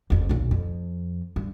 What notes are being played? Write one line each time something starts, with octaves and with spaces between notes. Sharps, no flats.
F#1 F2
B1 A#2
F2
G2